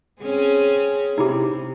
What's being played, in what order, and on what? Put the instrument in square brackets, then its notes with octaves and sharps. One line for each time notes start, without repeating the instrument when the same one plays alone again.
[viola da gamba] C4 C#4 G#4
[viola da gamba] C3 [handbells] D#4 E4 G4